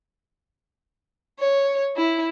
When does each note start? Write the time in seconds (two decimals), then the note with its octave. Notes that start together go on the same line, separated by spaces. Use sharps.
1.39 C#5
1.96 E4